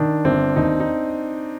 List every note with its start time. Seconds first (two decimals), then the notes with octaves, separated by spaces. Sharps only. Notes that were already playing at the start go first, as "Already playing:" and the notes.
Already playing: D#3 D4
0.25 G1 C4
0.56 D#2 D#4
0.80 D#4